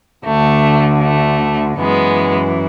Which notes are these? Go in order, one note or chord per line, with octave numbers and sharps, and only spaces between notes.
D2 D3 A3
A3
F#2 E3 G#3 B3